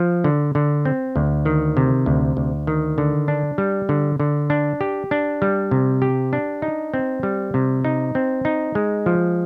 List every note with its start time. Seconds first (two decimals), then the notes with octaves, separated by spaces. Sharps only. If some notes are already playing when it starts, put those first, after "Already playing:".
Already playing: F3
0.24 D3
0.55 D3
0.85 C4
1.16 D2
1.45 D#3
1.77 C3
2.06 D2
2.37 D2
2.67 D#3
2.98 D3
3.28 D4
3.58 G3
3.89 D3
4.20 D3
4.50 D4
4.81 G4
5.11 D4
5.42 G3
5.71 C3
6.02 G4
6.33 D4
6.62 D#4
6.94 C4
7.23 G3
7.54 C3
7.85 D#4
8.15 C4
8.45 D#4
8.75 G#3
9.06 F3